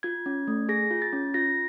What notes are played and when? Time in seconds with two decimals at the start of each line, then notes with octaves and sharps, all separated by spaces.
0.03 F4 G#6
0.26 C#4
0.48 A3
0.69 G#4 A#6
0.91 F4
1.02 A6
1.13 C#4
1.34 F4 A#6